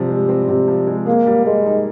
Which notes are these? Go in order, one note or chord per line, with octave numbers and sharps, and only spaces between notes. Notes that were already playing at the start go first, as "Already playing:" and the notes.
Already playing: C3 F3 G3 C4
G#3
C4
C3
F3
G#3
A#3 G#4
G3
G#3 A#3
D#4